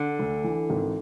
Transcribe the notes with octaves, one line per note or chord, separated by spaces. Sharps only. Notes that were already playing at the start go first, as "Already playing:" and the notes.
Already playing: D3
D2
E3
G#1